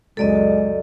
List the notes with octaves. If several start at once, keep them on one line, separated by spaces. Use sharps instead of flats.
C#2 F#2 G#3 A4 D5 D#5